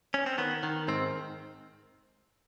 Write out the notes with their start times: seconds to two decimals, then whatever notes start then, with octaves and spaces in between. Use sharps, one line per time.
0.14 C#4
0.26 C4
0.38 D#3 B3
0.63 D#3
0.88 G#2 C4